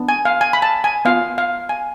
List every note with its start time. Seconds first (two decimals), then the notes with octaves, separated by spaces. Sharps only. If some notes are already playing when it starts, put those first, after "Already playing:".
Already playing: B3 D4
0.09 G#5
0.25 F5
0.41 G#5
0.53 B5
0.62 A5
0.84 G#5
1.05 B3 F4 F5
1.38 F5
1.69 G#5